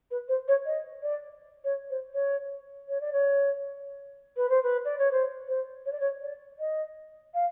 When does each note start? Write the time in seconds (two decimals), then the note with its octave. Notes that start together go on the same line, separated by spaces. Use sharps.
0.11 B4
0.28 C5
0.48 C#5
0.65 D#5
1.03 D5
1.64 C#5
1.90 C5
2.14 C#5
2.88 C#5
3.01 D5
3.12 C#5
4.37 B4
4.49 C5
4.63 B4
4.85 D5
4.98 C#5
5.11 C5
5.48 C5
5.85 C#5
5.92 D5
6.00 C#5
6.22 D5
6.59 D#5
7.34 F5